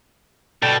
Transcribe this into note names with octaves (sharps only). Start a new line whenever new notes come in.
B2 A4 D5 G5